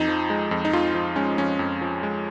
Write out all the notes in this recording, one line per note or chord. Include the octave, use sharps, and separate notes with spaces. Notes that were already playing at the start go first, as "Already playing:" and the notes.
Already playing: F2 D#4
F3
G#3
F2
D#4
F2 F4
F3 D#4
G#3 C#4
F2 C#4
F2
F3
G#3